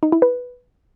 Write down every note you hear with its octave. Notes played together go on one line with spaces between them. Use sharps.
D#4
E4
B4